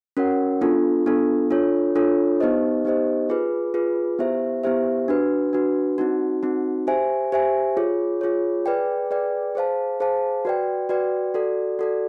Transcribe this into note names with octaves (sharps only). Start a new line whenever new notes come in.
C#4 F#4 A#4 C#5 F#5
B3 D4 F4 A4
B3 D4 F4 A4
D4 F4 A4 C#5
D4 F4 A4 C#5
B3 D#4 G4 C5 D#5
B3 D#4 G4 C5 D#5
F4 G#4 B4
F4 G#4 B4
B3 E4 G4 C5 E5
B3 E4 G4 C5 E5
D4 F#4 B4
D4 F#4 B4
C4 D#4 F#4
C4 D#4 F#4
G4 C5 E5 G#5
G4 C5 E5 G#5
F4 G#4 C#5
F4 G#4 C#5
G#4 B4 D5 G5
G#4 B4 D5 G5
G#4 C5 F5 A5
G#4 C5 F5 A5
F#4 B4 D5 G5
F#4 B4 D5 G5
F#4 A4 D5
F#4 A4 D5